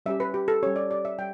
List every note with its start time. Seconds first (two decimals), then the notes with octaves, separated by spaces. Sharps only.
0.06 G3 C#4 G4 E5
0.20 B4
0.34 G4
0.48 A4
0.63 G3 C#4 G4 C#5
0.76 D5
0.91 D5
1.05 E5
1.18 G3 G5